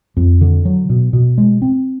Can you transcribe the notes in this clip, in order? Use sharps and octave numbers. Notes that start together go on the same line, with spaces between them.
F2
D3
F#3
B2
B2
G#3
C4